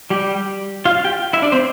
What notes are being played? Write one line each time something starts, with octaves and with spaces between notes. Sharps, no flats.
G3 G4
F4 F5
G4 G5
E4 E5
D4 D5
C4 C5